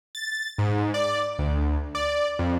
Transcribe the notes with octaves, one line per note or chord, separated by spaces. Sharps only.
A6
G#2
D5
D2
D5
F2